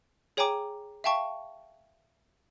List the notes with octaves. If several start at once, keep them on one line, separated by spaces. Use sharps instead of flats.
G#4 C#5 G5 G#5 A#5 D6
E5 F5 G5 A5 C#6